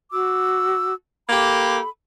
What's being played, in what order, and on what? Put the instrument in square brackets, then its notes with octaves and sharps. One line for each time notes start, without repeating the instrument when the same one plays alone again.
[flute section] F#4 D6 E6
[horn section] A#3 G4 [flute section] A4 B5